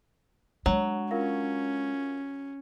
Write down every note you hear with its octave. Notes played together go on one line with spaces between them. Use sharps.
F#3 G#3 D4 C#5
C#4 F4 A#4 F5